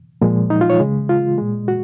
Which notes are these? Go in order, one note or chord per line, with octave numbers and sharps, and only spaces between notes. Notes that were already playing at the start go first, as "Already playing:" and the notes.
A#2 F3 G#3
D#4
F4
C#5
C#3 G#3
F4
A#2 G#3
F#4